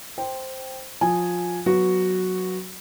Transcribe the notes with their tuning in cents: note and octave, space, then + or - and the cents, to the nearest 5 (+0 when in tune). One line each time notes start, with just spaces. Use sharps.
C5 +0 G5 +0
F3 +20 G#5 +0
F#3 +0 B3 +0 F#4 +0